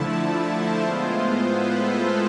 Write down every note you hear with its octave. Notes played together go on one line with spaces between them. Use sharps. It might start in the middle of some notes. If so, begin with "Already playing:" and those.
Already playing: D3 F3 A3 E4 A5
A5
C5
A2 G#3 B3 F4 C5
B4
A4